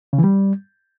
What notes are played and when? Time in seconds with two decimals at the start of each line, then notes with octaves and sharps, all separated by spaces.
0.13 C#3
0.18 E3
0.24 G3